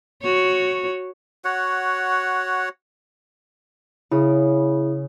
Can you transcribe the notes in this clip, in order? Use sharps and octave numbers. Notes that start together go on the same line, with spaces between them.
F#4 C#5
F#4 C#5 F#5
C#3 E4 G#4